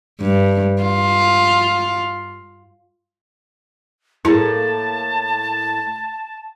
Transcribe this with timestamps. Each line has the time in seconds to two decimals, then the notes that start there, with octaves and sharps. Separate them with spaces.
0.21 G2
0.83 F4
4.25 A2 A#3 E4 G#4 A5